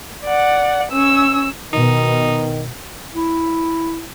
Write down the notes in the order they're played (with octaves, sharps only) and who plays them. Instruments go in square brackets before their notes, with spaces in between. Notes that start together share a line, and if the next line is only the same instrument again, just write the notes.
[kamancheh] D5 F#5
C#4 E6
[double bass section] B2 [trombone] D#3 [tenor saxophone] D#4
[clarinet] E4